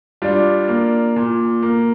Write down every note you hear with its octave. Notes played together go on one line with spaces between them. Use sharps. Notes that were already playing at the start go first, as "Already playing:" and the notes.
G3 D4 F4
A#3
A#2
A#3